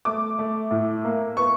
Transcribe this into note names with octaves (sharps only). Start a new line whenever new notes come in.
A3 D6
A3
A2
A#3
B3 C#6